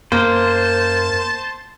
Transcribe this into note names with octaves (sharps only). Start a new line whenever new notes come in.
F#2 A#3 C5 A5